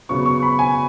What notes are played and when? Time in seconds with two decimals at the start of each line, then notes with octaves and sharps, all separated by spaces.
0.09 F#2 C#3 B3 C#6
0.26 C#6
0.43 B5
0.59 G#5